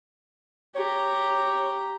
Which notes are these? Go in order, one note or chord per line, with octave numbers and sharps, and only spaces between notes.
G4 C#5 A#5